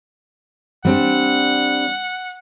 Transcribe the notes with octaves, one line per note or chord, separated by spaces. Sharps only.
G3 C4 D4 F#5